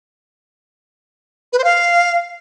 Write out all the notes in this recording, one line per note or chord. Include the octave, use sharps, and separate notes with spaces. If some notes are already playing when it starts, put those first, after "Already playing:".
B4
C5
F5